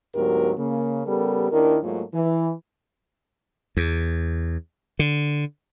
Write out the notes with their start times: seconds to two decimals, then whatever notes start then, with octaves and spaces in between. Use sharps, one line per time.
0.15 D2 G#2 F#3 B3 G4 A#4
0.58 C#3 A#3
1.06 C#3 G3 B3 G4 A4 A#4
1.51 D#2 D#3 D4 E4 A#4
1.83 G#2 F#3 A3 A#3 D#4 F4
2.14 E3
3.77 E2
4.99 D3